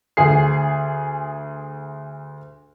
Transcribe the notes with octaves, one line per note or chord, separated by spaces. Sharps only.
D2 G#4 C7